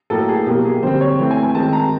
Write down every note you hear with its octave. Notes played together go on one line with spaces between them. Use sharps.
A2 F#3 A#3 A4
G#4
B2 F#3 A#3 G4
G#4
D3 G3 C4 C5
C#5
E3 A3 C4
G#5
G#5
D#3 G#3 C4 A5
A#5